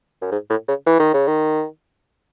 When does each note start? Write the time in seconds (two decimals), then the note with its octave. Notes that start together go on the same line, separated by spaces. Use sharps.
0.22 F#2
0.32 G#2
0.50 A2
0.68 C#3
0.86 E3
1.00 D#3
1.14 C#3
1.27 D#3